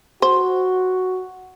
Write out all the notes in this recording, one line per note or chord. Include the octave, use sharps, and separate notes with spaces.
F#4 C5